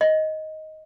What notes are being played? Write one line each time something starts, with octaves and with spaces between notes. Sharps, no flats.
D#5